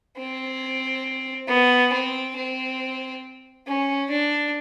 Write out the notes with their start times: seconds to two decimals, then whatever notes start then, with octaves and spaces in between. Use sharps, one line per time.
0.17 C4
1.48 B3
1.92 C4
2.36 C4
3.67 C#4
4.10 D4